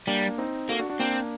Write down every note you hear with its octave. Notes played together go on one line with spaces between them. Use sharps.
G3 A#3 D4
C4 D#4
A#3 F#4 A4
D4 F#4
D4 F#4
A#3 C4 D4